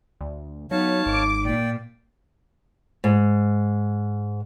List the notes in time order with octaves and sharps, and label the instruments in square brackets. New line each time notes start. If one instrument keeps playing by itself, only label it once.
[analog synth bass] D2
[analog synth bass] F#3 [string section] B3 [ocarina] D#4 [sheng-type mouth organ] C#5 F5 A5
[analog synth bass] G#1 [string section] D6
[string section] A#2 [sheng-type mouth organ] D5 G5
[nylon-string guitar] G#2